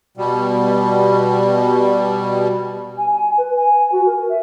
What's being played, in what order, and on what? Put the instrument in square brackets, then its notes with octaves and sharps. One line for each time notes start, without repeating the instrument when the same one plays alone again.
[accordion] B2 G3
[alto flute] G#5
G#5
B4
G#5
F#4
A#4
E5